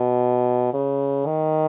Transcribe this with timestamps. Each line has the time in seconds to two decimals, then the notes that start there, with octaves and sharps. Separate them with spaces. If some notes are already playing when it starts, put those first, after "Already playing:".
Already playing: B2
0.73 C#3
1.26 D#3